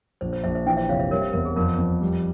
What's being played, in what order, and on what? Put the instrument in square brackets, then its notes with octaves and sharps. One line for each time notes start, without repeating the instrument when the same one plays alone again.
[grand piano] A#1 [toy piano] C5
[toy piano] C5
[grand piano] A#1 [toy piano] C5 E5
[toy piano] C5 E5
[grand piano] E3 [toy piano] E5 G5
[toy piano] C5 E5
[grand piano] F1 [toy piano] C#5 F5
[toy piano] C5 E5
[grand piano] G3 [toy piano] A#4 C#5
[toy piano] C5 E5
[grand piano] E2 [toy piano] A#4
[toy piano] G#4
[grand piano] F2 [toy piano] A#4
[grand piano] F2
G3